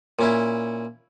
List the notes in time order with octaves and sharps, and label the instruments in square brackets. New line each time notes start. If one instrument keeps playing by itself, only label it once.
[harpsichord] A#2 C#4 E4